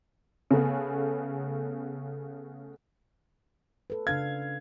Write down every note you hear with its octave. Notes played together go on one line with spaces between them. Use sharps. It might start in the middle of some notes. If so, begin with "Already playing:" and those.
C#3 A3 B3
A4 B4
C#3 D4 F5 G#6